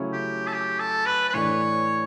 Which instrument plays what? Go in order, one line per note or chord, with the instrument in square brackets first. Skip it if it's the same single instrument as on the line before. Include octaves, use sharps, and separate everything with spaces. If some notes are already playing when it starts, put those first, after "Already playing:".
Already playing: [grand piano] C#3 F#3 A3 C#4 E4
[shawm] G4
A4
G4
A4
B4
B4
[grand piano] A2 E3 A3 D4 [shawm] C#5